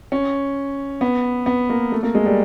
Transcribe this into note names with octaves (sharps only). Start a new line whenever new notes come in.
C#4
B3
B3
A#3
A3
A#3
G#3
G3